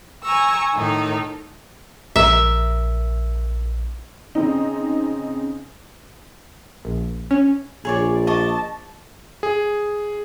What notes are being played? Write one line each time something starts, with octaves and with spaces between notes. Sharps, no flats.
G#5 A#5 C#6 E6
A2 D#3 D#4 A4
A#1 A#4 E5
C#3 C4 D#4
A#1
C#4
A#1 G#4 C#5 D5
D#5 A5 C#6 D6
G#4